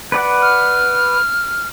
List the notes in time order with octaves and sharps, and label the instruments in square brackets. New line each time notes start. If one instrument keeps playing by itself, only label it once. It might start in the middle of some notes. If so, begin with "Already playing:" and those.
[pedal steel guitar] B4 D5 F#5
[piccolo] F6